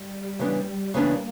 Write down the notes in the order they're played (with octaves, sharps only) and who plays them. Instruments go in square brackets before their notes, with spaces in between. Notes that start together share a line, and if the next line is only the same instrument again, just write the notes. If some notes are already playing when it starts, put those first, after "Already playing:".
Already playing: [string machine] G3
[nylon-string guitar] C#3 E3 B3 D4
[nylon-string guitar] C#3 E3 B3 D4 [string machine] A#3